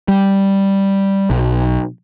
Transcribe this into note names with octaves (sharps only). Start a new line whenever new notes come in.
G3
B1